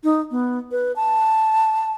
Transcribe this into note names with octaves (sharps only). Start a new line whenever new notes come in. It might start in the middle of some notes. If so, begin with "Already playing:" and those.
D#4
B3
B4
A5